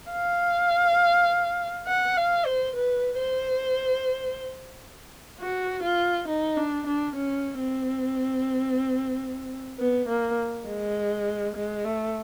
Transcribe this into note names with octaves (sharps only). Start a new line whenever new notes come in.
F5
F#5
F5
C5
B4
C5
F#4
F4
D#4
D4
D4
C#4
C4
B3
A#3
G#3
G#3
A3